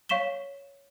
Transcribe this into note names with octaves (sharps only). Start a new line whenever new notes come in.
C#5 F5 C#6 B6 E7 G7